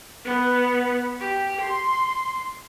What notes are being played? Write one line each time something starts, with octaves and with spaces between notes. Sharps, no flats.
B3
G4
C6